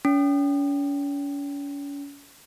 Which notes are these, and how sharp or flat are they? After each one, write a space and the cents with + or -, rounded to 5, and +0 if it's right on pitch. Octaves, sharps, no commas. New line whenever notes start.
C#4 +40